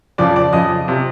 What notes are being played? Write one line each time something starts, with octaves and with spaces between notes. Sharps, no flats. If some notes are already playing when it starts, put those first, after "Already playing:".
F2 C#3 F3 D5 D6
D5 D6
F2 C#3 F3 D#5 D#6
C3 F3